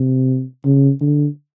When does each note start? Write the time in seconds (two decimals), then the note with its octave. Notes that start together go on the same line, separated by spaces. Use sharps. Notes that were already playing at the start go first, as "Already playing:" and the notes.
Already playing: C3
0.65 C#3
1.01 D3